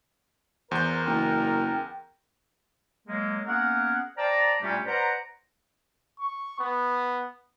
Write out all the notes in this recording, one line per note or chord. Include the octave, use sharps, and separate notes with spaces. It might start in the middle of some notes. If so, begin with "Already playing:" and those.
E2 A#4 C5 G6
F#1 G5
F#3 G#3 A#3
A#3 B3 C#4 G#4 A#4 F#5
C5 D5 G5 A5 A#5
A#2 G3 A3 C#4 D4 G4
B4 C5 D5 F#5 A#5
C#6
B3